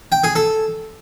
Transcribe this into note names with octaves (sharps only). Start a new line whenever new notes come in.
G5
G#4
A4